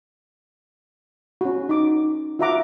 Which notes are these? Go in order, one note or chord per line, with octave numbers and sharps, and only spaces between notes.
C#4 F#4
D#4 D6
F4 F#4 E5 F#5 A#5 D6